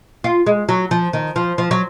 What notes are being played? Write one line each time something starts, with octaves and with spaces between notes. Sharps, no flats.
F4
G#3
F#3
F3
D#3
F3
F3
F#3